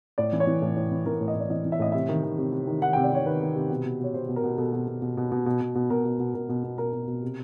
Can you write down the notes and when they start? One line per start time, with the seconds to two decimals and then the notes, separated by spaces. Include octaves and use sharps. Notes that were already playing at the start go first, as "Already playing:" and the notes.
0.18 A2 D5
0.33 E3
0.40 C#5
0.47 E3
0.62 A2
0.76 A2
0.92 E3
1.06 E3 A#4
1.21 A2
1.28 D#5
1.35 A2 D5
1.50 E3 D#5
1.65 E3
1.72 E5
1.79 A2 D#5
1.92 C3 E5
2.09 D#3
2.23 D#3
2.38 C3
2.53 C3
2.67 D#3
2.82 D#3 F#5
2.93 C3 G5
3.04 D5
3.12 C3 C#5
3.26 D#3 B4
3.41 D#3
3.55 C3
3.70 B2
3.85 B2
4.00 B2 C#5
4.14 B2 C5
4.29 B2
4.36 A#4
4.44 B2
4.58 B2 A4
4.73 B2
4.87 B2
5.02 B2
5.17 B2
5.32 B2
5.46 B2
5.61 B2
5.75 B2
5.90 B2 A#4
6.05 B2
6.19 B2
6.34 B2 A#4
6.49 B2
6.64 B2
6.78 B2 A#4
6.93 B2
7.08 B2
7.22 C3